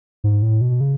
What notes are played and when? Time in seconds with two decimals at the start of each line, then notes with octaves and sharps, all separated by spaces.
0.24 G#2
0.42 A2
0.61 B2
0.81 C#3